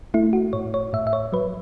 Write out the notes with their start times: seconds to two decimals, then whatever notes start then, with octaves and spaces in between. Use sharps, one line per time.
0.14 A3 E4
0.33 F#4
0.53 A2 C#5
0.74 C#5
0.93 A2 E5
1.07 E5
1.13 C#5
1.33 F#3 B4